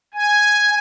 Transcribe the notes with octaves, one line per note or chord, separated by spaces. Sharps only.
G#5